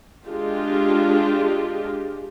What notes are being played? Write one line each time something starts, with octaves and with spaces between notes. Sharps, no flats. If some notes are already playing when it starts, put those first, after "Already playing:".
G#3 D4 F4 G4